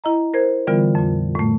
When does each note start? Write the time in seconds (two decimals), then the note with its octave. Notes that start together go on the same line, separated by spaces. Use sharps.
0.04 E4 D#5 A#5
0.34 A#4 C5 G#6
0.67 D3 E3 G3 B3 F4 A#4
0.95 F2 A#2
1.35 A2 A3